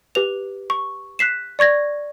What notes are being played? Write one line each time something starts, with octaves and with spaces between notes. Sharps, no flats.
G4 B4 F7
C#6
F#6 B6 C7 E7
D5 C#6 G#6 A#6